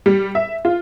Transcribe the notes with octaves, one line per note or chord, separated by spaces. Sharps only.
G3
E5
F4